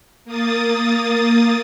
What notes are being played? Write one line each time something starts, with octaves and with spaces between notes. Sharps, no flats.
A#3 D#6 A6